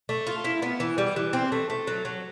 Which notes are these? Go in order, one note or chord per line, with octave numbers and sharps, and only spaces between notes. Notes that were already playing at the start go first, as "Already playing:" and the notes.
A3
F4
E4
B3
E3
G3
E3
C4
A3
A3
F#3
F#3